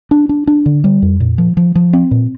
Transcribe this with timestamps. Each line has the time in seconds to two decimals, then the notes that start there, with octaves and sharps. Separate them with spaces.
0.11 D4
0.29 D4
0.47 D4
0.66 D3
0.84 G3
1.02 F2
1.20 A#2
1.38 F3
1.57 F3
1.75 F3
1.93 C4
2.11 A#2